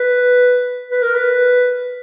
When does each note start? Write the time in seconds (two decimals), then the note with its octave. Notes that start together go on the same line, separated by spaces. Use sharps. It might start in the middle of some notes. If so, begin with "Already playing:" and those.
Already playing: B4
0.91 B4
1.02 A#4
1.14 B4